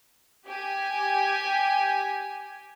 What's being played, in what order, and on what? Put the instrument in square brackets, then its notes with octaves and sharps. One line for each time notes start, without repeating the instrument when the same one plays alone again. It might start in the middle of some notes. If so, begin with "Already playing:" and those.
[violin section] G4 G#5